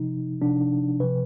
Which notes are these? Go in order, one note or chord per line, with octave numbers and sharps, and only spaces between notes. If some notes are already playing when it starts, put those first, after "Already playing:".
Already playing: C3 F3 D#4
C3 F3 D4
C3 F3 B4